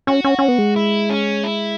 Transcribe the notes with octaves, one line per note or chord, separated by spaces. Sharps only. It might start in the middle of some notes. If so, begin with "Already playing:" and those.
C#4 F#4
C#4
C#4
B3
G#3
E4
C#4
E4